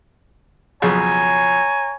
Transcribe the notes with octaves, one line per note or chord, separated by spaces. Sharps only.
B1 F2 C#3 C#5 G#5 A#5